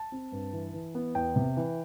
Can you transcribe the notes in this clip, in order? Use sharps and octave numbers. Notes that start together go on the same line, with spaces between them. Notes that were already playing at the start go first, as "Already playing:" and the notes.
Already playing: A5
C4
G2
E3
E3
B3
E2 G5
C3
E3